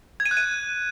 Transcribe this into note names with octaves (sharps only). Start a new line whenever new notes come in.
G#6
D#7
F#6
D#7